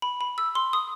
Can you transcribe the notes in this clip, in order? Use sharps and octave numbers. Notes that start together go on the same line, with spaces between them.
B5
B5
E6
C6
D#6